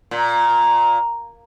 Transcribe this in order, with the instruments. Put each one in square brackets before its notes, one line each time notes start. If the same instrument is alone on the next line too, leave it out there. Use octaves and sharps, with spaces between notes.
[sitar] A#2